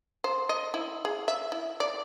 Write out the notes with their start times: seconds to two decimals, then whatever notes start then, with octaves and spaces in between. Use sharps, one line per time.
0.24 C5
0.49 D#5
0.74 E4
1.05 G#4
1.28 E5
1.52 E4
1.80 D5